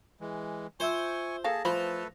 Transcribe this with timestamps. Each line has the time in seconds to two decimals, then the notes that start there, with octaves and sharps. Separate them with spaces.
0.21 E3 G#3
0.80 F4 C5 E5 G#5 C#6 E6
1.44 A#3 G#4 A4 F5 A5 A#6
1.65 E3 F3 A3 A4 B4 C5 B5